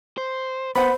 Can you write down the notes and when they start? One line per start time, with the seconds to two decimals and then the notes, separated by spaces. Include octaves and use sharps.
0.18 C5
0.76 B3 C5 F#5 B5